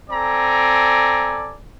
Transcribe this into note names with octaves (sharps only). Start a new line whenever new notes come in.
C4 A4 D5 G#5 A#5